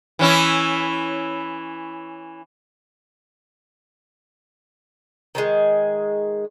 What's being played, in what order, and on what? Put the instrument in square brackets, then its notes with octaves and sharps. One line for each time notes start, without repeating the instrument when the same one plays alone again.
[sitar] E3 C#4 E4
[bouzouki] D#3 F#3 G#3